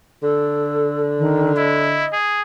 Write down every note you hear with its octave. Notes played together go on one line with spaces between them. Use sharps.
D3 A4
D#3
E4 D#5
G#4